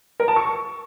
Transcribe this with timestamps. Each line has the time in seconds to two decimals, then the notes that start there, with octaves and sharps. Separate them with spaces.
0.20 A#4
0.28 A5
0.36 C#6